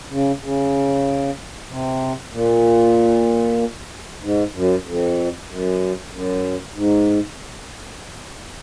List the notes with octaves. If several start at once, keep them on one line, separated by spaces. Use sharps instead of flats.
C#3
C#3
C3
A#2
G#2
F#2
F2
F#2
F#2
G#2